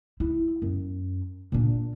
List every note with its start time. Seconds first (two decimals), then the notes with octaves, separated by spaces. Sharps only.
0.20 E4
0.62 F#2
1.52 A#2 D4